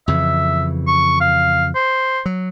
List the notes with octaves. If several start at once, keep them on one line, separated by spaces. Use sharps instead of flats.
F2 C#3 E3 E5
C#6
F5
C5
F#3